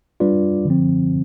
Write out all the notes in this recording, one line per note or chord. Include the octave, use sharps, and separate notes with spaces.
G3 D4 F4 B4 D5
D3 F3 C4